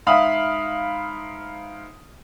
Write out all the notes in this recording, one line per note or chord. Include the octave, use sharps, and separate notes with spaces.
G#2 E5 F5 B5 D#6